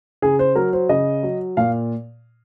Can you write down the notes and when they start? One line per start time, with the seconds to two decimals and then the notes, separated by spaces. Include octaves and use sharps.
0.22 C#3 G#4
0.39 C5
0.55 F#3 A#4
0.73 C5
0.89 C#3 D#5
1.23 F#3
1.57 A#2 F5